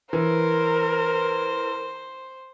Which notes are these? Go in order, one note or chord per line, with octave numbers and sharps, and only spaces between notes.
E3 A#4 C5